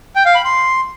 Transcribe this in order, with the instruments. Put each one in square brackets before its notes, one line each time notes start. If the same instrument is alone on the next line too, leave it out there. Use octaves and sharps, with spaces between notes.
[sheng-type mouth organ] G5
F5
B5
C6